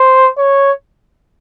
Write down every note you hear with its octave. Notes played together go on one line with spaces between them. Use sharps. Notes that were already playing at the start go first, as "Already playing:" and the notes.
Already playing: C5
C#5